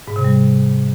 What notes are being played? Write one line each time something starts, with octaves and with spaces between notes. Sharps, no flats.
G#2
C3
G3